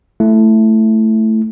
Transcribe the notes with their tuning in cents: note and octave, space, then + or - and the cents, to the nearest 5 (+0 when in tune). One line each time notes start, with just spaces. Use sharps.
A3 +0 E4 +10